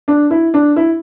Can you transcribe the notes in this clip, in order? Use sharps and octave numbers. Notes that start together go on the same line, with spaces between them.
D4
E4
D4
E4